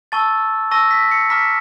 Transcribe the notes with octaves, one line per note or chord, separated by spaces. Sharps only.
A5 C#6 E6 A6
A5 C#6 E6 A#6
B6
C#7
A#5 D6 F6 B6